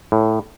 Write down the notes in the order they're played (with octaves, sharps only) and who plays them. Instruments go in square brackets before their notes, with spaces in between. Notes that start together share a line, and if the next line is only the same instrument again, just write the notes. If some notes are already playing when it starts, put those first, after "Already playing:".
[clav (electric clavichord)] A2